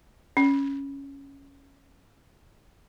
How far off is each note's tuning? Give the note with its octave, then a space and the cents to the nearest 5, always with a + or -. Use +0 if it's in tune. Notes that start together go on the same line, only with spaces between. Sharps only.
C#4 +0